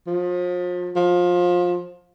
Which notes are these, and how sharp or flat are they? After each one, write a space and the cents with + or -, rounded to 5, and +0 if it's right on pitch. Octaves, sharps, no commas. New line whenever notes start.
F3 +35
F3 +25